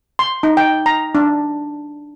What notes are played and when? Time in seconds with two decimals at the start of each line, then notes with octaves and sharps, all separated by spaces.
0.19 C6
0.43 D#4
0.57 G5
0.86 A#5
1.15 D4